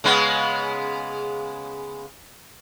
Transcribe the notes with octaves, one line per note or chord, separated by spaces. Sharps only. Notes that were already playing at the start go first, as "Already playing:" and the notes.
C#3 G#3 B3